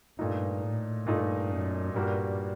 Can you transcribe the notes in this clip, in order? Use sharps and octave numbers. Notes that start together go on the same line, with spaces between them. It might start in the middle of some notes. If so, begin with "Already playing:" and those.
G2 A#2 A3 D#4
A2
G2 A#2 A3 D#4
F#2
G2 A#2 G3 A#3 F#4 A#4